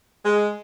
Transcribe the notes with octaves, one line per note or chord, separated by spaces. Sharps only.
G#3